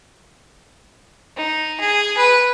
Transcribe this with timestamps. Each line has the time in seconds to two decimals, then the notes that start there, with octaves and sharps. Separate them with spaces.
1.37 D#4
1.80 G#4
2.17 B4